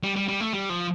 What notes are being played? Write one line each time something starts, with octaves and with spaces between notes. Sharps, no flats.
G3
G3
G3
A3
G3
F3